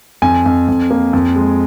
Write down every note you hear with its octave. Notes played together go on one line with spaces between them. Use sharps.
F2 G#5
F2
F2
A#3
F2
G#3